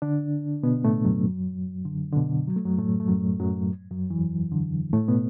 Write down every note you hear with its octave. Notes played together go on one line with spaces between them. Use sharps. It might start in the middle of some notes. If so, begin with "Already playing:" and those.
D3 D4
B2 B3
A2 A3
F#2 F#3
D3
D3
B2
F#3
A3
F#2 F#3
A2 A3
A3
F#2 F#3
F#2 F#3
F#2 F#3
E2 E3
D3
A2 A3
B2 B3